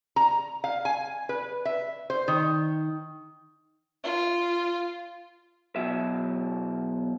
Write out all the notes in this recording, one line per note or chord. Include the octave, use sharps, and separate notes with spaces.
A#5
F5
G#5
B4
E5
C5
D#3
F4
E2 B2 F#3 E5